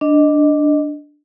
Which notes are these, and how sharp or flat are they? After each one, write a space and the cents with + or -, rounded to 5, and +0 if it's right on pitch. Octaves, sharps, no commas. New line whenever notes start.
D4 +0 D#5 -5